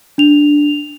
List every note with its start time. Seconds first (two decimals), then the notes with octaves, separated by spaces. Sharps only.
0.18 D4 F7